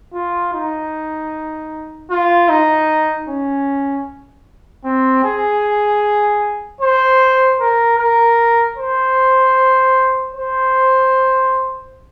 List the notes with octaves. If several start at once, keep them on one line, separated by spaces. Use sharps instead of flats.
F4
D#4
F4
D#4
C#4
C4
G#4
C5
A#4
A#4
C5
C5